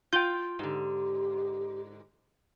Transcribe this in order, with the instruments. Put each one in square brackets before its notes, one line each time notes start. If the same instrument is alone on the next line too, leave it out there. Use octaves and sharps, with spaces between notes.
[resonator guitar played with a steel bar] F4 G5 [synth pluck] G6
[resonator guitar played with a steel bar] G#2 D3 [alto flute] G4